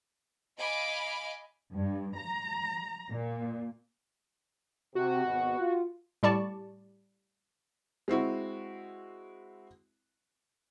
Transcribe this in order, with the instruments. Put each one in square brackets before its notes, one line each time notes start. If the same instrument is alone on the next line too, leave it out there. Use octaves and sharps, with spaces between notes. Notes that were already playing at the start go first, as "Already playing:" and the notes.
[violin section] D#5 F5 G#5 B5 D6
[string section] G2
A#5
A#2
[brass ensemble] C3 [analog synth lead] F#4
[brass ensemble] G#1 B2
F4
[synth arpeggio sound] A2 G3 D5 A5 C#6
[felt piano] G#3 C4 E4 F#4